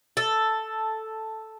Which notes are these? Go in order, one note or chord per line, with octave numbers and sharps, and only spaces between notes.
A4